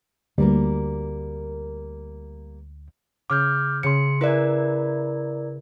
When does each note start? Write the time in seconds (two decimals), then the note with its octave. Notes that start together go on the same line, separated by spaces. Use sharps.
0.38 D2 G3 A#3 A#4
3.30 C#3 D6 F6 G6
3.83 C#3 C6 C#7
4.21 E4 A#4 B4 D5 E5 G#5